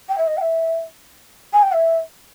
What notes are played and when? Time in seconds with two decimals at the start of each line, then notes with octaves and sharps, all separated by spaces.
0.09 G5
0.18 E5
0.27 D#5
0.37 G5
0.41 E5
1.53 G#5
1.62 G5
1.72 E5